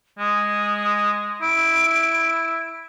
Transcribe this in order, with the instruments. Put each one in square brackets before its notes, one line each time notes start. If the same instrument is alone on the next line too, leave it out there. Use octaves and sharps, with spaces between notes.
[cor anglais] G#3 [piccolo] D#6
[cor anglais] E4 [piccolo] D7